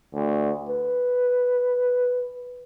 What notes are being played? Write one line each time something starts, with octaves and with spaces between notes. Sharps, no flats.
D2
B4